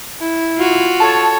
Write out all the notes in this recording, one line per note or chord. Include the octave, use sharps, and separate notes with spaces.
E4
F4 F#4
A4 C#5 A5